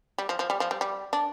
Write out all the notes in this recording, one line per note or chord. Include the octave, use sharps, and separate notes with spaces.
G3
F3
F3
G3
F3
G3
G3
D4